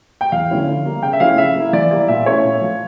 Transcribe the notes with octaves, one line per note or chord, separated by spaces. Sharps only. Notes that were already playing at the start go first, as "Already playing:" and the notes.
G5
E2 F5
D3 F3 C#4 E4
D3
G3 A#3
C#3 G5
E5
F3 A3 C#4 E4 F5
C#3 E5
F3 A#3 E4
E3 D5
G3 A#3 E4 D5
A#2 E5
A3 C#4 E4 C#5
A#2
F3 A3